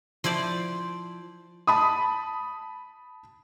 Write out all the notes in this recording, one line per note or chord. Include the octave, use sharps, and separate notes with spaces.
F3 E4 C5 D5
A5 B5 D#6